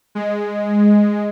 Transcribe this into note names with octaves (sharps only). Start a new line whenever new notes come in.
G#3